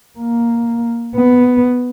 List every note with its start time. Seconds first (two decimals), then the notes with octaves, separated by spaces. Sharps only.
0.19 A#3
1.16 B3